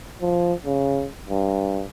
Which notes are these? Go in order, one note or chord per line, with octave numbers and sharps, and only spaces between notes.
F3
C#3
G2